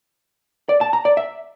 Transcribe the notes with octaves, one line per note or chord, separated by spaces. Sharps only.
D5
A5
A#5
D5
E5